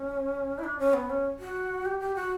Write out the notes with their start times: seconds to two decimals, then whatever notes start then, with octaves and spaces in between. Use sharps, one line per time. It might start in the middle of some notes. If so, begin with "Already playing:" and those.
Already playing: C#4
0.58 E4
0.64 D4
0.79 C#4
0.94 B3
1.10 C#4
1.39 F#4
1.85 G4
2.00 G4
2.15 F#4